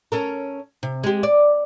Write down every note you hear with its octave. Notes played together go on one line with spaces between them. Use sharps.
C#4 A4 A#4
C3
G#3 G4
D5